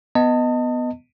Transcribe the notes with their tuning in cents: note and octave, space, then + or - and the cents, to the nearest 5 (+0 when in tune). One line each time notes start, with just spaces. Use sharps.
B3 +5 D#5 +0 A5 +30